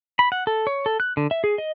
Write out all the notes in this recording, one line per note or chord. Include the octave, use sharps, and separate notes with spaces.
B5
F#5
A4
C#5
A4
F#6
D3
E5
G#4
D#5